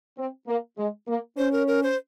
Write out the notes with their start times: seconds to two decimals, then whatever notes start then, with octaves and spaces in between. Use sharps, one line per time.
0.18 C4
0.47 A#3
0.78 G#3
1.08 A#3
1.37 C#4 C5
1.52 A#4
1.67 A#4
1.83 C5